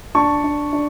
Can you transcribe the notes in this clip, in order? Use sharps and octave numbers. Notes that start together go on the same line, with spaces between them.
D4 A5 C#6
D4
D4